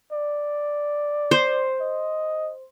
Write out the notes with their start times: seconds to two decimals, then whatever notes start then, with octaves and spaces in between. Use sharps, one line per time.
0.12 D5
1.31 C5
1.80 D#5